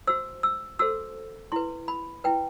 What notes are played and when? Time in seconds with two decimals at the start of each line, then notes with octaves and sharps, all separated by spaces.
0.07 F#4 C5 E6
0.43 E6
0.79 F#4 A4 C5 E6
1.52 E4 B4 C6
1.88 B5
2.24 E4 B4 G5